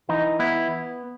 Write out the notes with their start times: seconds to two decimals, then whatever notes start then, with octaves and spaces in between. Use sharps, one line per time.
0.09 E3 D#4
0.40 B3 E4